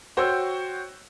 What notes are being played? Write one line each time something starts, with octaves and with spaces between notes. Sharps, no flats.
F#4 C5 C#5 G5 C#6 E6